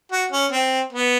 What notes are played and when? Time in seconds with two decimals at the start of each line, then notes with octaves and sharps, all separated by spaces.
0.12 F#4
0.32 C#4
0.52 C4
0.92 B3